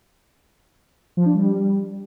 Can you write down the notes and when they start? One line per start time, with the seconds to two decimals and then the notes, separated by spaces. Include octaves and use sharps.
1.17 F3
1.26 D4
1.35 G3